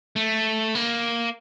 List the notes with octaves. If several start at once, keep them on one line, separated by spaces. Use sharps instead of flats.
A3
A#3